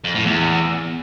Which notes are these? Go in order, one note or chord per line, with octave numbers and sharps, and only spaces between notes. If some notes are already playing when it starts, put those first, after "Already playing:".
F2
A2
E2